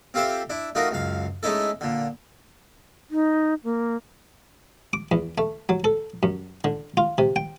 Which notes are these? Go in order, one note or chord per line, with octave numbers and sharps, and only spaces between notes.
C4 F4 G4 A4 C5 E5
D4 E4
A3 D#4 F4 F#4 A#4
C#2 F#2 F5
G#3 A3 C#4 D#4 E4 A4
A#2 D3
D#4
A#3
D6
E2
A3
F#3
A4
F#2
D3
F4
C3
G5